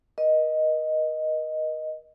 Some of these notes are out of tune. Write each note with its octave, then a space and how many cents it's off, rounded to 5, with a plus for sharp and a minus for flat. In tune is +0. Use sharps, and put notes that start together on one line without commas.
A#4 +45 D#5 +0